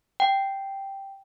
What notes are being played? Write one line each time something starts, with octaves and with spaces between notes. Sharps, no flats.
G5